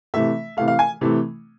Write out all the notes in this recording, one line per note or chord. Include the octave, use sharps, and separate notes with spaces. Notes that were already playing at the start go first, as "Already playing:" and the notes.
C3 E3 A3 E5
C3 E3 A3 F5
F5
G#5
C3 E3 A3